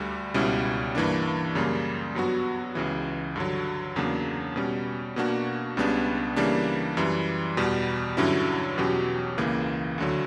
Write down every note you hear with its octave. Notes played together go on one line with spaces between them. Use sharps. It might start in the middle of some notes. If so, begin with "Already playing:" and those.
Already playing: D2 D3 G3
C#2 B2 G3 C#4 E4
G2 E3 A#3 D4
F#2 C#3 G3 A#3
G2 F#3 B3 F#4
C#2 C#3 E3
G2 D3 F#3
E2 C#3 F#3 A#3 D4
B2 G3 C#4
B2 A#3 D4 F#4
C#2 C#3 G3 B3 D4
C#3 E3 G3 A#3 D4
F#2 E3 G3
E2 B2 G3
G2 D3 F#3 C#4 E4
E2 B2 F#3 C#4 G4
C#2 C#3 E3 A#3
D2 D3 F#3